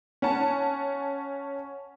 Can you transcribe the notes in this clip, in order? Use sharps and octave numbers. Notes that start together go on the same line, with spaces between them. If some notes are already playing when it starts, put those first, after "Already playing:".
C#4 F#5 A5